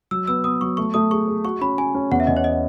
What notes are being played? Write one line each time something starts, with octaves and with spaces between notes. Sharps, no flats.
F#3 E6
B3 E6
B3 D#6
F#3 C#6
A3 C#6
A3 D#6
G#4 C#6
G#4
F#4 C#6
C#4 B5
C#4 G#5
C#4
E2 F#5
E5
E2 D#5
C#5
D#5